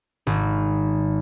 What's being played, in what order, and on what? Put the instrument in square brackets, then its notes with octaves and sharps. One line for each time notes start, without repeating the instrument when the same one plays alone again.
[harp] G#1